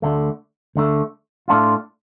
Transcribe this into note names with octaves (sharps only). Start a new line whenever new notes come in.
D2 D3 A3
D2 D3 A3
A2 A3 D4 F4